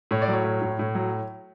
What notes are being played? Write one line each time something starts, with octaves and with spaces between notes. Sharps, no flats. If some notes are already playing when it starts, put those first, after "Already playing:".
A2 C#5
D5
F#3
C#5
A2
A2
A2
F#3